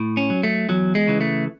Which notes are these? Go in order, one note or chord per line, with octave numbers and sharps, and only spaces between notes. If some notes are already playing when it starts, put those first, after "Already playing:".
Already playing: A2
C#4
F#3
A3
E2 F#3
G#3
C#3 E3
A3